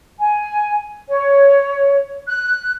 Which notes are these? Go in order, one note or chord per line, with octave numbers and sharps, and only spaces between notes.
G#5
C#5
F#6